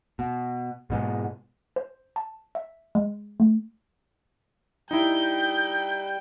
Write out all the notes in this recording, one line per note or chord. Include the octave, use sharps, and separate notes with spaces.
B2
G#2 B2 G#3
C5
A5
E5
G#3
A3
G3 D#4 E4 G5 G6